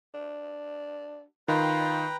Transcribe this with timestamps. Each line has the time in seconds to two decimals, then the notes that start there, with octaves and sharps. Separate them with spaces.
0.14 D4
1.48 D#3 F4 B4 G5 A#5